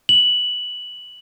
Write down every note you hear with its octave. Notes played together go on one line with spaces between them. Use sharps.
F#7